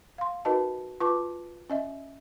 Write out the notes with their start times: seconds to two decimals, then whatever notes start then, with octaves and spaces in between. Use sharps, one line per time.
0.18 F5 C6
0.45 D#4 F#4 A#4 B4 D#5 A5
1.00 F4 B4 A5 C#6 D6
1.70 C#4 D#5 E5